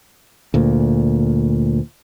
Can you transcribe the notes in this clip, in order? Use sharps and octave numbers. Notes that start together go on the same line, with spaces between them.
D2 A#2